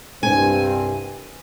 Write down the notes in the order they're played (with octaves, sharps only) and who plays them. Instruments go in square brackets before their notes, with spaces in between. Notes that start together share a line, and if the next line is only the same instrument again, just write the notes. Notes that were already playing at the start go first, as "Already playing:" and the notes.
[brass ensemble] C2 G2 C4 [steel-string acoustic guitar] G#5